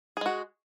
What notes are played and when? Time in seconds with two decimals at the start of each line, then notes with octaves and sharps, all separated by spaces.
0.17 G#4
0.21 G#3
0.26 F#4